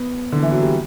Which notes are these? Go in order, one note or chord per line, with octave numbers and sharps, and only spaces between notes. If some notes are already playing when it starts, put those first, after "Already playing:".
Already playing: B3
D3
E3
F#3
G3